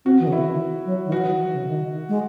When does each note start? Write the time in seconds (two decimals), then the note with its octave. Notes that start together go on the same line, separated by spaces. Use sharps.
0.05 C4 F#4
0.19 E3
0.27 C#3
0.32 D#3 E4
0.46 E3
0.85 F#3
1.06 D#3
1.11 E3 F#4
1.26 F#3
1.39 E3
1.52 C#3
1.66 D#3
2.08 G#3